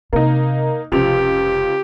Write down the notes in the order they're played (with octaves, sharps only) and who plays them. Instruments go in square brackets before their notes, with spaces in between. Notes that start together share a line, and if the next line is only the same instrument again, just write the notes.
[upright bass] C3 [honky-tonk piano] A#3 D#4
[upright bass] F1 C3 [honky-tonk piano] C#2 F3 F7 [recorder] G4